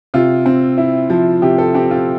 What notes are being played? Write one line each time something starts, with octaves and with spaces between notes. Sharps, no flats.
C3 F4
C4
E4
F3
C3 G4
A4
C4 G4
F4